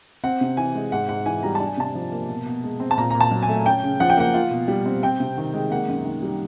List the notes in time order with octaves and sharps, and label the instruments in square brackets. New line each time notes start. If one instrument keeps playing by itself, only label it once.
[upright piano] C4 F#5
C3
E3 G#5
G#3
G#2 F#5
G#2 F#5
E3 G#5
G3 A#5
D4 A5
G#5
C3 A5
F3
A#3
B2
B2
G#3
C4
A5
A#2 A#5
A#2 A#5
A5
F#3
G#5
A3
C#4 G5
C#3
F3 F#5
G5
A#3 F#5
F4
B2
G3
C4
C4 G5
C3
D#3
G#3
A#3 F#5
F#2
D#3
G3